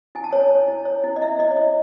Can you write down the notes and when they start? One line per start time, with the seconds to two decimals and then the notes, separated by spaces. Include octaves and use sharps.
0.15 E4 G#5
0.24 A5
0.31 C#5 G#5
0.51 C#5
0.68 E4
0.85 C#5
1.04 E4
1.16 D#5
1.22 E4 E5
1.39 E4 D#5
1.51 C#5
1.56 E4 D#5